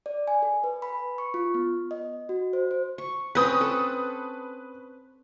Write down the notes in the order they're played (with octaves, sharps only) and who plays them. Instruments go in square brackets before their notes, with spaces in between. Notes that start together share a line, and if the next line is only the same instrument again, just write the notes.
[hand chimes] D5
G#5
A4
B4
B5
C#6
F4
B3
D#5
F#4
C5
C5
[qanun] C#6
[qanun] C4 C#4 [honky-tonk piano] B4 D#6
[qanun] A4